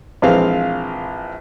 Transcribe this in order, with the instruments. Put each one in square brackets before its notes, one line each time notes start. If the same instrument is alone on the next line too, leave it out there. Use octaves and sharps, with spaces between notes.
[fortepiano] A#1 E3 G#3 C4 F5